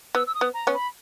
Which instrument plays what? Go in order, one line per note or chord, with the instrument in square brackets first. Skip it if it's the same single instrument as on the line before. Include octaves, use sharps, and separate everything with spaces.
[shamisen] B3 [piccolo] E6
[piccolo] E6
D#6
[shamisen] B3
[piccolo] A#5
[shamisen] B3 C#4
[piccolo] B5